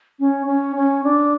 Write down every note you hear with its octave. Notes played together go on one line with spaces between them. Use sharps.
C#4
C#4
C#4
D4